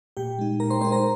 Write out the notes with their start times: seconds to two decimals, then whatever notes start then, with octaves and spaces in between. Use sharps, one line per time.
0.17 A#2 G4 G5
0.39 G#3 D#4
0.60 A#2 A#4 A#5
0.70 C5 C6
0.81 G#3 C5 C6
0.84 D#4
0.92 A#4 A#5